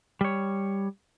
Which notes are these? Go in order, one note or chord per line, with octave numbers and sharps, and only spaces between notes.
G3 C#5